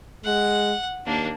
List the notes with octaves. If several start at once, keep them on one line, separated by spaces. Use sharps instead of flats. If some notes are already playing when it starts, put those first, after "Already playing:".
G#3 F#5
D#2 A#3 D4